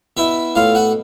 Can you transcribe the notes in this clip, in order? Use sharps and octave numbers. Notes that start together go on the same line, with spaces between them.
B2 E4 E5
A2 F4 F5
F#4 F#5